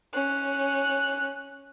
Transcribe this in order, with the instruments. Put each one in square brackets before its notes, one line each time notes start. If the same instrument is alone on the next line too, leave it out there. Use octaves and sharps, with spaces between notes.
[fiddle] C#4 F#6